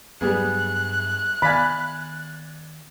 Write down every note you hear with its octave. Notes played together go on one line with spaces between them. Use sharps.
G2 F#3 G3 B3 G#4 F#6
D#3 B3 D5 F5 G#5 B5